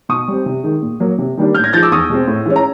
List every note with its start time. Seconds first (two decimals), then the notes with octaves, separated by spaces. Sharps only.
0.09 B2 C#6 D#6
0.28 G3 C4
0.46 C3
0.64 D#3 G#3
0.82 A#2
1.00 F#3 A#3
1.18 C3
1.37 D#3 G3 A#3 D4
1.54 A2 F6 G6
1.64 G#6 A#6
1.73 F3 G6 A6
1.77 G#3
1.83 D6 E6
1.91 E2 C#6 D#6
2.10 B2 G#3 C4
2.27 A2
2.46 E3 G#3 C#4
2.56 A#5